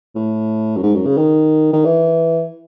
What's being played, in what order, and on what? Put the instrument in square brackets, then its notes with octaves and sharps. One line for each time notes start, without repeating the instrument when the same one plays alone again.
[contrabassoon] A2
F#2
G#2
F#2
C#3
D#3
D#3
E3